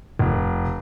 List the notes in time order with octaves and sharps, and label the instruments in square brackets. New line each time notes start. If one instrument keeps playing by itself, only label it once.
[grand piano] F1